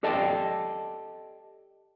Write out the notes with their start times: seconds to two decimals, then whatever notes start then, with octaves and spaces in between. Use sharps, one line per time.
0.03 G4 A4 D5 D#5 G5 A5